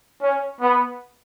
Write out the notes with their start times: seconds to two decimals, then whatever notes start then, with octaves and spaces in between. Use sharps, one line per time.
0.20 C#4
0.61 B3